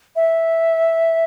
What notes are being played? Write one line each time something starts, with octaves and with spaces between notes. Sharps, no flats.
E5